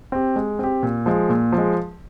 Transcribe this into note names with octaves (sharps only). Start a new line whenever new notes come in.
C4 G4
G#3
C4 G4
A#2
F3 G#3
A#2
F3
G#3